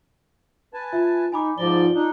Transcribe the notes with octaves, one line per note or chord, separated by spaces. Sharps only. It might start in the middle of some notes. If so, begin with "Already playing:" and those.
B4 G#5 A5
F4 E5
D#4 G#5 B5 D6
G#2 F3 F4 D5 G7
D4 D#4